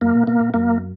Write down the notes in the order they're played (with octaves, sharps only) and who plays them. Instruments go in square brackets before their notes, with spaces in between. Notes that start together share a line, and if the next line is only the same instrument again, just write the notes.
[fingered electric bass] F#2 [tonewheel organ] A#3
[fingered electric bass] A#2
[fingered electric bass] B2 [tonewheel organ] A#3
[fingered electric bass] A#2
[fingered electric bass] F#2 [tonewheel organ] A#3